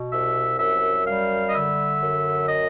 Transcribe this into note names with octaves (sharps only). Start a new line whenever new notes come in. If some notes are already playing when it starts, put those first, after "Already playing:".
Already playing: B2
C2 E5
F#2 E5
G3 F5
D#5
D3 E5
F#2
D#5